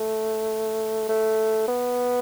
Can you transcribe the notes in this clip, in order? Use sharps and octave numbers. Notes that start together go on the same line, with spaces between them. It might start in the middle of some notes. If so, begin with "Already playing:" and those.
Already playing: A3
A3
B3